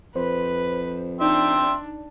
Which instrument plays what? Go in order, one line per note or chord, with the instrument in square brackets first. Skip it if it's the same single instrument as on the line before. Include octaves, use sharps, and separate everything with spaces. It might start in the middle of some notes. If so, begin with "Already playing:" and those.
[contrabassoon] F2 [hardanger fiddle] B4 [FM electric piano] C5
[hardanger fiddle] D4 [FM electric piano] D#4 D5 [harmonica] E5 G5 C6